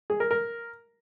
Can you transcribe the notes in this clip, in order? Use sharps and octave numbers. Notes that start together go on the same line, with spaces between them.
G#4
A#4
A#4